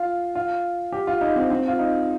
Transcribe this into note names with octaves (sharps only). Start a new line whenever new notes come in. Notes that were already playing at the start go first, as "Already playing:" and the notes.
Already playing: F4
F4
G4
F4
D#4
C4
C4
F4
D#4